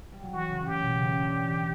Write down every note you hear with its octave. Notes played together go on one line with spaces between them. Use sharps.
G3
F#3
E3 F#4
C#3
A2 G4
B2
C#3
D3
E3